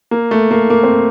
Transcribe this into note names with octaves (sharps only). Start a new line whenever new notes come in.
A#3
A3
A#3
A#3
C4